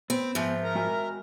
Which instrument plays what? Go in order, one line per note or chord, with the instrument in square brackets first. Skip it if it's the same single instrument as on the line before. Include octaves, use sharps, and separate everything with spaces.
[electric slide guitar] B3 [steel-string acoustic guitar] C4
[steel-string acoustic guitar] G#2 F3 [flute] E5
[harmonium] A#4 A#5
[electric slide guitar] G#3 F#4 G#5